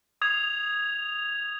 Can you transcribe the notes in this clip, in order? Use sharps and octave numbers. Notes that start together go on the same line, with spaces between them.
D#6 G#6 F7